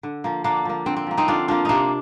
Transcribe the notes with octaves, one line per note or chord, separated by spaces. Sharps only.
D3
F3 A#3
D3 A#3 D4
F3 A#3
D3 C4
C4
F3 A#3
C4 D#4
D3 D4 F4
F3 A#3 D4 F4
C3 A#3 D4 D#4